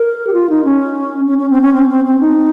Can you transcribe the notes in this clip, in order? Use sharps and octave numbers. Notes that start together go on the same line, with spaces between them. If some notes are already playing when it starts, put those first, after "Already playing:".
Already playing: A#4
G4
F4
D#4
C#4
C#4
C#4
C4
C#4
C4
C4
C4
D#4